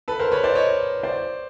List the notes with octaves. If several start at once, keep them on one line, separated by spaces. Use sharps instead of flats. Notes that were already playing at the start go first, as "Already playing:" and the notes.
A4 B4
A#4 C5
B4 C#5
C5 D5
C#5 D#5
C5 D5